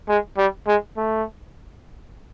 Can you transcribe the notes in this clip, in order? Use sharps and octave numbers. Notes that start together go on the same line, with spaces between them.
G#3
G3
G#3
A3